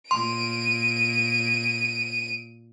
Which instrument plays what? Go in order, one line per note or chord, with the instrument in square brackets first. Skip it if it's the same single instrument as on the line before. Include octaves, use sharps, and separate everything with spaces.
[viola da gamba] A#2 [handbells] C6 [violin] D7 D#7